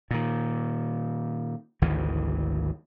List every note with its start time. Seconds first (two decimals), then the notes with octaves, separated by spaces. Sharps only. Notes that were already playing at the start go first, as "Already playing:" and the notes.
0.11 A#2 D#3
1.82 G#1 D2 D#3 E3